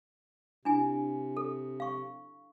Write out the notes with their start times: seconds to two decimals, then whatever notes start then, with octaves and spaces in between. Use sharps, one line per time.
0.65 C3 D4 E4 G#5
1.37 A4
1.80 F5 C#6